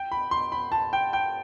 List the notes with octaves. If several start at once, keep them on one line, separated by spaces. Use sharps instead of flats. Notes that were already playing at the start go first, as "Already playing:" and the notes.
Already playing: G5
B5
C6
B5
A5
G5
G5